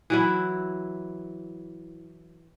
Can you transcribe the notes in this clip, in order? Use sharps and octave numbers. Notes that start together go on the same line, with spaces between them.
E3 F#3 E4